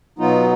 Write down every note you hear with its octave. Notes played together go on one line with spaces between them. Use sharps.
B2 F#3 B3 D#4 F4